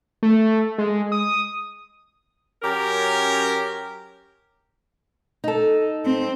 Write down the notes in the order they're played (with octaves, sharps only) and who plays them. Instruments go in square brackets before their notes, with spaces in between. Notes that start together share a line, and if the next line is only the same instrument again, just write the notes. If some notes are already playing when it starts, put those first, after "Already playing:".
[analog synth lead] A3
G#3
D#6
[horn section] F#2 C#4 G4 A#4
[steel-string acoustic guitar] D#4 A4
[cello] C4